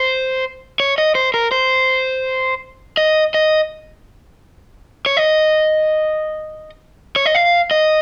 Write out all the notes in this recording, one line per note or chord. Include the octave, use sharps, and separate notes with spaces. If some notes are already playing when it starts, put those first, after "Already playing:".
Already playing: C5
C#5
D#5
C5
A#4
C5
D#5
D#5
C#5
D#5
C#5
D#5
F5
D#5